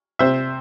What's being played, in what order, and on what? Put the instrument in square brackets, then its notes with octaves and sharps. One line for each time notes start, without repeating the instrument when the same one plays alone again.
[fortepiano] C3 C5 E5